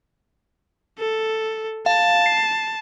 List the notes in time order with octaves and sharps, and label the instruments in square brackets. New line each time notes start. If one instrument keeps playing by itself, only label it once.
[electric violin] A4
[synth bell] F5 [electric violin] A5
[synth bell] C7